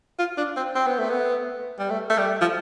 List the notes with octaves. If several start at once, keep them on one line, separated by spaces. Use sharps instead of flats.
F4
D4
C4
C4
B3
A3
B3
G3
A3
A3
G3
F3